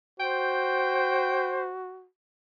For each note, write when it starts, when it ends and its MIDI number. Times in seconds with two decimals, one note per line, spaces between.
0.20 2.07 66
0.20 1.69 72
0.20 1.62 79